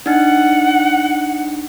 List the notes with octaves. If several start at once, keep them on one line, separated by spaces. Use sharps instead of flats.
D4 D#4 F#5